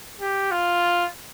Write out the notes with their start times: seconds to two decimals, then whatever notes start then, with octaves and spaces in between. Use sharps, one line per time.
0.21 G4
0.51 F4